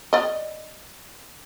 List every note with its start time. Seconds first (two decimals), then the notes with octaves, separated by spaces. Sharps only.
0.13 D5 D#5